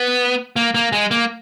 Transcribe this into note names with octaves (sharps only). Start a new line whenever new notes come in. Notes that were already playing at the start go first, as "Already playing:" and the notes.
Already playing: B3
A#3
A#3
G#3
A#3